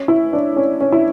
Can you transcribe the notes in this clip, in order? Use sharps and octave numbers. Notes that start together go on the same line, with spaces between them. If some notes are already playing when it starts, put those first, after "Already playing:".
Already playing: C#4
E4
D4
C#4
C#4
E4